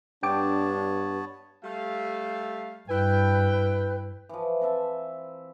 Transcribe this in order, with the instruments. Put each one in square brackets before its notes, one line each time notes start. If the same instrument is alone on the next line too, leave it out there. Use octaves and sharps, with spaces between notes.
[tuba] G2 [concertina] B3 C#5 A5 [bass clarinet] D4 [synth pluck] G5 D6
[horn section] G3 A3 F5
[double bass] G2 [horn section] E4 G5 [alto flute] B4
[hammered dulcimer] E3 F3
C4 B4 E5 A5